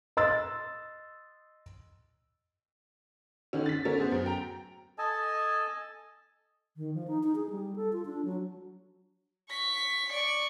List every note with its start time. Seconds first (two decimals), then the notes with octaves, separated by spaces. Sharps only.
0.17 D#5 C6 E6 A6
3.53 D3 D#3 C#4
3.66 A6 B6
3.85 D3 A3 C#4 A#4
3.98 B3 G#4 C5
4.11 F#2
4.26 G5 A#5
4.98 A4 D#5 G#5 A5
6.77 D#3
6.94 F3
7.07 D#4
7.23 D#4
7.35 G#4
7.50 G3
7.76 A4
7.93 F4
8.06 D4
8.25 F#3
9.50 C#6 B6
10.09 D5 C#6